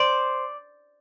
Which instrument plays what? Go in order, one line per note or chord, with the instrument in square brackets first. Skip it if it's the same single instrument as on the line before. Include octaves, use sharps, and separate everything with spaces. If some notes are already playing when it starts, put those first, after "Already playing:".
Already playing: [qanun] C5 D5